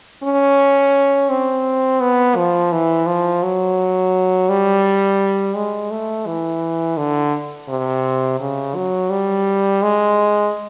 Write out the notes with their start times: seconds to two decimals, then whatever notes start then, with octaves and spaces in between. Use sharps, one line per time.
0.23 C#4
1.29 C4
2.01 B3
2.36 F3
2.72 E3
3.07 F3
3.43 F#3
4.49 G3
5.55 G#3
5.91 A3
6.26 E3
6.97 D3
7.69 C3
8.40 C#3
8.75 F#3
9.10 G3
9.82 G#3